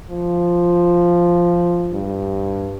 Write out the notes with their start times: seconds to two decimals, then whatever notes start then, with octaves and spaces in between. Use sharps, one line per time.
0.10 F3
1.93 G2